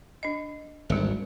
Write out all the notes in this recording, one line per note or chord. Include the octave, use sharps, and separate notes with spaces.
D4 D#5
G#1 D2 G3 G#3 A4